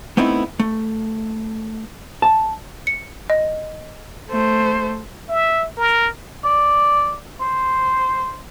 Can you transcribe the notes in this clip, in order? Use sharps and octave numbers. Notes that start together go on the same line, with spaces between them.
A3 B3 C4 D#4 E4
A3
A5
C#7
D#5
A3 C5
E5
A#4
D5
C5